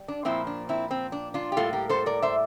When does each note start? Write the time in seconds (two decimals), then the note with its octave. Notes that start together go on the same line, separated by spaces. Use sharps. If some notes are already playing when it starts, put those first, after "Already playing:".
Already playing: G3
0.08 D4
0.25 A#2 F3 A#3 C4 E4
0.47 D4
0.69 C4 E4
0.91 C4
1.12 D4
1.34 D4 F4
1.52 G4
1.57 A2 G3 A#3 F4 A4
1.73 G4 A#4
1.89 A4 C5
2.06 A#4 D5
2.22 C5 E5